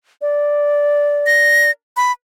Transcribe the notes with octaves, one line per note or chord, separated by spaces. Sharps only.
D5
A#6
B5